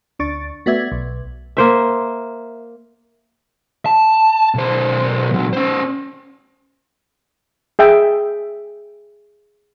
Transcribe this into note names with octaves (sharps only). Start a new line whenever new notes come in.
D2 D4 C#6 A6
A3 B3 F#4 D5 E5 G#6
B1
A#3 C5 E5
A5
B1 C5
A#2 F#3
C#4 C5
G#4 E5 G5